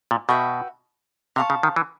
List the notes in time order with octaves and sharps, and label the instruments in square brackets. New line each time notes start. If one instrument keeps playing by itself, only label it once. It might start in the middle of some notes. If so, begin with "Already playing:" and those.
[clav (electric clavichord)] A#2
[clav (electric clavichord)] B2 [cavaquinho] F#4 B4 E5 G5
[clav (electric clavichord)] C3 [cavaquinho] C5 F5 A5 C#6
[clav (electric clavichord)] C#3
D#3
E3